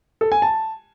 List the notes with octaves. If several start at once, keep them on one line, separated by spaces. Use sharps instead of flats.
A4
G#5
A5